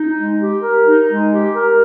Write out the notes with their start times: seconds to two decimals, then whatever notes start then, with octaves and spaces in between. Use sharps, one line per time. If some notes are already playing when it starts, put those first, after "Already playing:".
Already playing: D#4
0.17 G#3
0.39 G4
0.62 A#4
0.85 D#4
1.09 G#3
1.32 G4
1.55 A#4